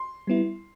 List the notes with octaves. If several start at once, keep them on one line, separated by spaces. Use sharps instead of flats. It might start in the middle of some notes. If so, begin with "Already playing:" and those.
Already playing: C6
G3 B3 E4